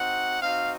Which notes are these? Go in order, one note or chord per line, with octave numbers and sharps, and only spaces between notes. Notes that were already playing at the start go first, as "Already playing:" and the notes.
Already playing: C4 D#4 F#4 F#5
C4 D#4 F#4 F5